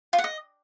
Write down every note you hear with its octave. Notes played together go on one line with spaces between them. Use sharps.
F4
F#5
D#5